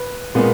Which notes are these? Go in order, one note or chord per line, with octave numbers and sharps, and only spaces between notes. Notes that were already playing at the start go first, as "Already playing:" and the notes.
Already playing: B4
A#2 G#3 B3